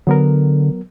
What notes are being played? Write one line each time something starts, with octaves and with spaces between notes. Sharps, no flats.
D3 F#3 B3 A#4